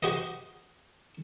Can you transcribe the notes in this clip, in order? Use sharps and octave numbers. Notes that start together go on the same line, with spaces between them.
F#4 G4 C5 D#5